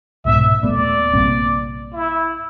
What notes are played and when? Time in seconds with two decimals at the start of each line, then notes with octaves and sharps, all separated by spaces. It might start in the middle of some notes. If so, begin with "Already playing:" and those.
0.25 C2 G#2 B2 E5
0.63 D#1 A#2 A3 B3 D5
1.13 A#1 G2 C3 A#3 C4
1.93 E4